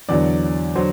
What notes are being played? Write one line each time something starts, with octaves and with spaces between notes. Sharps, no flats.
E2 D3 F#3 D5
D3 F#3 C5